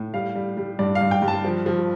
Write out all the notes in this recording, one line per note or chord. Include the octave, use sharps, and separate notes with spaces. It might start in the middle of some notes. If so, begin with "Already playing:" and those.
Already playing: A2
G3 F5
G3
G3
G2 D5
F5
G2
G5
G2
A5
F3
F3